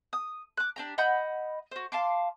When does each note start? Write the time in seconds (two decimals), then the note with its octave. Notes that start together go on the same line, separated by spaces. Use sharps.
0.13 D#6
0.57 D6 F#6
0.76 D4 G4 A#5
0.98 D#5 F#5 B5 G6
1.71 F#4 C5
1.92 F5 A5 C6 D6